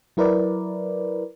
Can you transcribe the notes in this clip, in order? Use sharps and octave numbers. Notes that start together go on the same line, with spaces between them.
F#3 E4 A#4 B4 D5